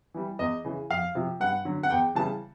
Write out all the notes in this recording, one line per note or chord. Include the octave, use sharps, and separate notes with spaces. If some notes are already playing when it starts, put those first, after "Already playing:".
E3 G3
E2 D#5
C#3 E3
F2 F5
C3 F3
G2 F#5
D3 F#3
F#5
E2 G5
C#3 E3 G3 A5